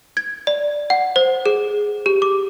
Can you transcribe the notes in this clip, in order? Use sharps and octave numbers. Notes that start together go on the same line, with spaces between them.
G#6
D5
F#5
C5
G#4
G4
D6